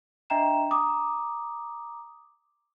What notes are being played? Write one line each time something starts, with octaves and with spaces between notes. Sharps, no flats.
D4 D#5 E5 G5 A#5 E7
A#5 D6 D#6